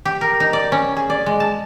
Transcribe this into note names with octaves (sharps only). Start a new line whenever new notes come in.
G4
A#4
D#4
D5
C#4
G#4
D5
G#3
A5